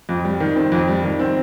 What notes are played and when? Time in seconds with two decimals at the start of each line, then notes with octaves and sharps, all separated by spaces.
0.09 F2
0.25 G3
0.40 D#3
0.56 C4
0.72 F2
0.88 G3
1.04 D#3
1.19 C4